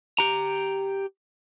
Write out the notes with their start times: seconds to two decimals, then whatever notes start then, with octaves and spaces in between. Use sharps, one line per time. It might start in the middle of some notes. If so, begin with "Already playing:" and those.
0.19 G4 A#5